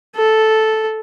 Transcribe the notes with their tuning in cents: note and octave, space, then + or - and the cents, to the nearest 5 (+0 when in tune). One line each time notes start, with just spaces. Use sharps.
A4 -5